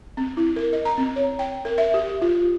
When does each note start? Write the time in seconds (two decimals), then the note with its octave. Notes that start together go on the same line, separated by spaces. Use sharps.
0.17 C4
0.37 E4
0.56 A#4
0.73 D#5
0.85 A#5
0.98 C4
1.16 C#5
1.39 G5
1.65 A#4
1.78 E5
1.94 G4
2.22 F4